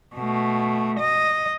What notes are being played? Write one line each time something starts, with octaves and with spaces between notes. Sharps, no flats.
B2 A3
D#5